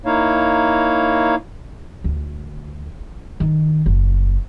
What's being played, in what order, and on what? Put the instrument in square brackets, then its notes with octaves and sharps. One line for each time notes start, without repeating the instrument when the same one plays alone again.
[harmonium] A#3 D#4 E4 C#5 F5
[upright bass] D2
D#3
F#1